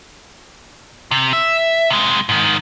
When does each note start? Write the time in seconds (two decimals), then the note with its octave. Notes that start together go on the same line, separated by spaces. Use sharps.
1.11 C3
1.33 E5
1.90 C3 G#3
2.29 G#2 D#3